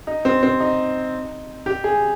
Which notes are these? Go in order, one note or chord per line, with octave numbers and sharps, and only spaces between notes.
D#4
C4
C4
D#4
G4
G#4